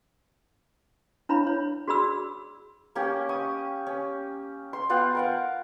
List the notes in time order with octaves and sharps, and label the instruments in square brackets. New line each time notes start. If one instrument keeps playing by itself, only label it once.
[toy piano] D4 E4 C#5 F5 B5
C#5
F#4 G#4 D5 B5 E6
[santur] A#3 C#4 G4
C#6 D#6
C#4
C6
B3 F4 F#5 G5
A#4 F5 F#5